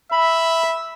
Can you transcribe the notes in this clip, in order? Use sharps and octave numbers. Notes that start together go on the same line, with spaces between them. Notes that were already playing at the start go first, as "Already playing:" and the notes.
E5 B5